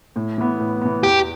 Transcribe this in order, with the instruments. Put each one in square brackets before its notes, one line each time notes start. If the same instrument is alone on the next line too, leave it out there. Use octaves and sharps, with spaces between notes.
[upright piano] A2
E3 B3
A2
E3 B3
[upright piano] E2 [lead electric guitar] G4